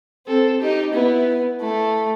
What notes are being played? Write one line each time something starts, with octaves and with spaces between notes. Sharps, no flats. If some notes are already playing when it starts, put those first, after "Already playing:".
C4 A4
D#4 G4
B3 E4
A3 E4